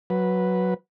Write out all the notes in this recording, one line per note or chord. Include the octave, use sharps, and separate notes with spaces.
F#3 B4